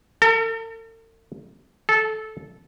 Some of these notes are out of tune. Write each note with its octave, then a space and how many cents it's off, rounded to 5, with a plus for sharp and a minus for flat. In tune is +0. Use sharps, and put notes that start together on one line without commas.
A4 +45
A4 -15